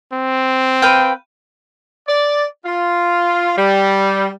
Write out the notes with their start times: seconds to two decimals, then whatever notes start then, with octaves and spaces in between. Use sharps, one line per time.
0.13 C4
0.82 B4 F5 G5
2.08 D5
2.65 F4
3.57 G3